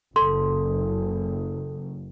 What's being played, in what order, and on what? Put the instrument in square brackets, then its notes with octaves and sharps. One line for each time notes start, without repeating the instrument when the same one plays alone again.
[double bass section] F#1 [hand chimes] A4 [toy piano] C6